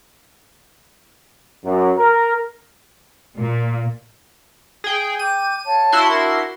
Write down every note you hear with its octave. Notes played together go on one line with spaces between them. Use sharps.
F#2
A#4
A#2
G#4 G5
G5 D6 G6 D#7
C#5 F5 A5
E4 F#4 C6
D4 A#4